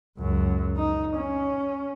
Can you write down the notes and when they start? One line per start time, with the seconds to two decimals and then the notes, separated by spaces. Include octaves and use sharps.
0.18 C#2 F#2
0.77 D#4
1.16 C#4